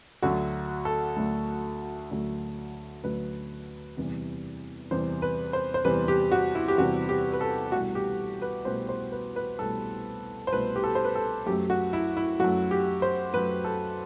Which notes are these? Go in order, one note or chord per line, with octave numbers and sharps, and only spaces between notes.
D2 D3 F#3 A3 F#4
A4
D2 D3 F#3 A3
D2 D3 F#3 A3
D2 D3 F#3 A3 B4
E2 C3 E3 G3
E2 C3 E3 G3 C5
B4
C5
C5
E2 C3 E3 G3 B4
G4
F#4
E4
G4
E2 C3 E3 G3 F#4
G4
B4
A4
C2 B2 A3 F#4
G4
B4
C2 B2 A3 C5
C5
B4
B4
C2 B2 A3 A4
C5
C2 B2 A3 B4
G4
A4
C5
B4
A4
F#2 F#3 A3 G4
F#4
E4
E4
F#2 F#3 A3 F#4
G4
C5
F#2 F#3 A3 B4
A4